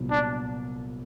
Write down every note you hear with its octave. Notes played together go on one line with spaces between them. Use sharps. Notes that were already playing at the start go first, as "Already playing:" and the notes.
Already playing: C2 A#2 F#3 B3
D4